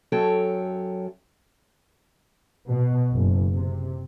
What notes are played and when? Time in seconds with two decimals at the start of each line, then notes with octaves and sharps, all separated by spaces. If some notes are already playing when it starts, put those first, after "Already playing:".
0.12 F#2 F#3 A4 C#5 G5
2.70 B2
3.14 F#1
3.53 C3